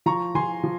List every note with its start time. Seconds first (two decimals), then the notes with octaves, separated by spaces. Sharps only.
0.06 F3 A#5 C#6
0.35 F3 G#5 C6
0.64 F3